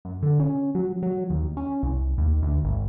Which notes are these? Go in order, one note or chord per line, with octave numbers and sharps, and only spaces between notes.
F#2
D3
C#4
F#3
F#3
D#2
C#4
C2
D#2
D2
G#1